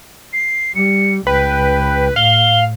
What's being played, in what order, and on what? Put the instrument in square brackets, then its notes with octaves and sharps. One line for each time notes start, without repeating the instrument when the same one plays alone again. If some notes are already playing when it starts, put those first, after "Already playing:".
[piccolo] C7
[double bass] G3 [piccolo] C#7
[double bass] C#2 [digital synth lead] B4 [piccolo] G5
[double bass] A2 [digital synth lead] F5 [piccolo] G7